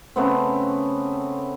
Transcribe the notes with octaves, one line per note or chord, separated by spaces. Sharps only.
C#3 A3 B3 C4